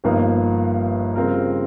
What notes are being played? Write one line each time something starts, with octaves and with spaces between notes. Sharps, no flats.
G1 G2 F3 A#3 D#4
C#3 G3 C4 F4 A#4